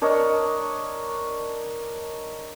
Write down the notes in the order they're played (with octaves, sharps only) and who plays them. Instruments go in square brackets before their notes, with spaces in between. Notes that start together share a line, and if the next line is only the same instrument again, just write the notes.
[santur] D4 A#4 C#5 D#5